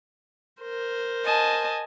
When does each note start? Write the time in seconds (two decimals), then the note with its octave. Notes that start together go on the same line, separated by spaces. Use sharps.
0.61 A#4 C5
1.24 D#5 G#5 A5